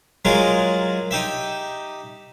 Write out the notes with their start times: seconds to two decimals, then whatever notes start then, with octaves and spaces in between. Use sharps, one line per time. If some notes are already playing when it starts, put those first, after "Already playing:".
0.25 F#3 G#3 F4 G#4 A#4
1.11 D#4 G4 E5